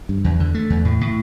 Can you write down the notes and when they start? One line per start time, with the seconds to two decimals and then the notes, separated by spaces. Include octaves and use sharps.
0.09 G2
0.24 E2
0.40 D3
0.54 A3
0.70 E2
0.85 A2
1.01 A2